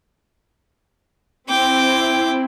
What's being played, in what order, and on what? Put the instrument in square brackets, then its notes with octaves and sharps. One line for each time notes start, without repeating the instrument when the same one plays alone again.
[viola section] C4 E4 [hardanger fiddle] G5 D6